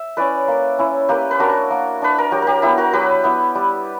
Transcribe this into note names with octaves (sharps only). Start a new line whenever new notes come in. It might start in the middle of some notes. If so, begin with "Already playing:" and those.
Already playing: E5
C#4 E4 B4 D5
A#3
C#4 E4
A#3 G4 B4
B4
D4 F#4 A#4
A#3
D4 B4
A#4
F#3 G4
G4 A#4
B3 E4 G4
F#4 A#4
F#3 G4 B4
B3 E4
G3